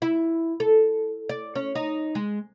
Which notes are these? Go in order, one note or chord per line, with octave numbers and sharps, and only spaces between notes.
E4
A4
D5
C#4
D#4
G#3